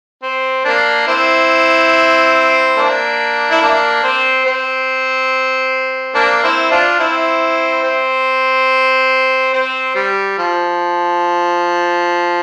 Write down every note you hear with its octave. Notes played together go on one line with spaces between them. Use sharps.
C4
A#3 D4
C4 E4
A#3 D4
E4
A#3 D4
C4
C4
A#3 D4
C4 E4
D4 F4
C4 E4
C4
C4
G3
F3